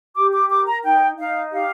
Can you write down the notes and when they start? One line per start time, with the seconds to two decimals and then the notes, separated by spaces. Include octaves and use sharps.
0.15 G4 D6
0.32 D6
0.50 A#4 D6
0.66 A#5
0.83 D#4 G5
1.17 D#4 F5
1.52 G4 F5